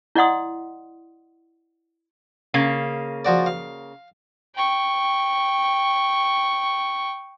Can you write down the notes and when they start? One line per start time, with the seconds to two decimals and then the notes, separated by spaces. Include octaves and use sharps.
0.15 E4 D5 D#5 F#5 C6 D#6
2.54 C#3 A#3
3.25 F3 F#4 D5
3.46 F5
4.55 G5 C#6